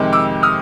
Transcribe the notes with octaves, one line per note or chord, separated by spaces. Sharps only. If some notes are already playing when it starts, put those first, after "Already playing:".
Already playing: F2 C3 D#3 G#3
D6 E6
D#6 F6